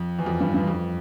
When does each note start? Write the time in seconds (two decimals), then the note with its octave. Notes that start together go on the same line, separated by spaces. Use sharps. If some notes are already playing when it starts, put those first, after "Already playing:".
Already playing: F2
0.19 E2
0.26 F2
0.40 G2
0.54 G2
0.67 F2